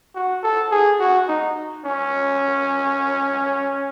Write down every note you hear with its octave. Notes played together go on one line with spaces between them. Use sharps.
F#4
A4
G#4
F#4
D#4
C#4